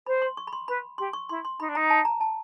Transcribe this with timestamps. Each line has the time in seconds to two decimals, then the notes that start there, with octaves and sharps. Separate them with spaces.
0.06 C5 B5
0.22 C6
0.37 C#6
0.47 B5
0.53 C6
0.68 B4 B5
0.98 G4 C6
1.13 C#6
1.29 E4 C6
1.45 C6
1.59 D#4 B5
1.68 D4
1.75 D#4 A#5
1.90 A5
2.05 A#5
2.21 A5